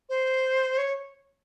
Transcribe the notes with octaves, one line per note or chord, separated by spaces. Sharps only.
C5
C#5